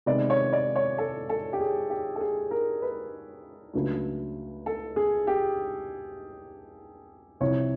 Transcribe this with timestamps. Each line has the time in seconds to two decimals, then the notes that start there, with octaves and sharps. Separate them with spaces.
0.06 C3 D#3 G#3 B3 D5
0.30 C#5
0.53 D5
0.76 C#5
0.98 A4
1.30 A4
1.53 G4
1.60 G#4
1.90 G4
2.16 A4
2.21 G#4
2.51 A#4
2.82 B4
3.73 C#2 C#3 F#3 A3 D4
4.66 A4
4.96 G#4
5.27 G4
7.40 C2 C3 F3 C#5